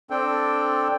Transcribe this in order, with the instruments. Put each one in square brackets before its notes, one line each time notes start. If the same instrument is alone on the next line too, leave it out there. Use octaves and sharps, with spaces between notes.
[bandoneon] C4 D4 A4 G5